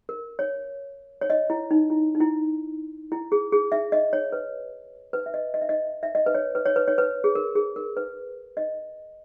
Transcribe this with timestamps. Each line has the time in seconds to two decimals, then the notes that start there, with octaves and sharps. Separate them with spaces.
0.09 A#4
0.39 C#5
1.21 C#5
1.30 D#5
1.50 E4
1.71 D#4
1.90 E4
2.15 D#4
2.20 E4
3.12 E4
3.32 G#4
3.52 G#4
3.72 E5
3.92 D#5
4.13 C#5
4.32 B4
5.13 B4
5.26 E5
5.34 D#5
5.54 D#5
5.61 E5
5.69 D#5
6.03 E5
6.15 D#5
6.26 B4
6.35 C#5
6.55 B4
6.66 C#5
6.76 B4
6.88 C#5
6.98 B4
7.24 G#4
7.35 A#4
7.55 G#4
7.76 A#4
7.97 B4
8.57 D#5